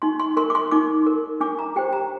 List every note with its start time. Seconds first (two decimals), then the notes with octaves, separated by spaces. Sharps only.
0.02 D#4 C6
0.20 C6
0.37 A#4 C6
0.50 D6
0.55 C6
0.71 D#4 D6
1.07 A#4
1.41 D4 D6
1.59 A#5
1.76 G4 C5 G5
1.93 A#5